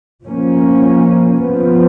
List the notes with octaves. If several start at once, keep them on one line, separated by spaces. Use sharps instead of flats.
F3 A#3 C#4
F3 B3